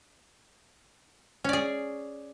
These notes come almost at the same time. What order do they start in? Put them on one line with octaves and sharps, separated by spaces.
C#4 D5 G#4